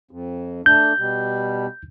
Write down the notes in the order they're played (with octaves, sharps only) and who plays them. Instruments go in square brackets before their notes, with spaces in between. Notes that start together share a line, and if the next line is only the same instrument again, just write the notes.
[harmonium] F2
[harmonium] A3 D4 [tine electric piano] G6
[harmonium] B2 G3